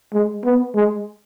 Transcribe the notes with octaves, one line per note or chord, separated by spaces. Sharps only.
G#3
B3
G#3